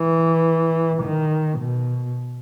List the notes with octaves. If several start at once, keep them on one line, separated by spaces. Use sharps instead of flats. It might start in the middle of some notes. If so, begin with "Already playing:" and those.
Already playing: E3
D#3
B2